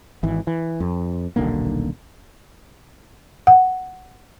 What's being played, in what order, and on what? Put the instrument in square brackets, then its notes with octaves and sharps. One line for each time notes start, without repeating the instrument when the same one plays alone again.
[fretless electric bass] G#1 E3
E3
F2
D#1 B1 D3 A#3
[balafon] F#5